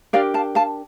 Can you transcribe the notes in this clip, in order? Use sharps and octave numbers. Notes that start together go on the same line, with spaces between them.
D4 G4 A#4 D5 F5
F5 A5
F5 A5